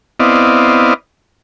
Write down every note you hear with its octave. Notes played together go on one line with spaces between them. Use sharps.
B3 C4 E4 D5 D#5 F5